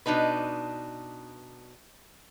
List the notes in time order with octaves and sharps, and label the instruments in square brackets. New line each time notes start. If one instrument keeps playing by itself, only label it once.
[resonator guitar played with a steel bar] B2 D4 D#4 B4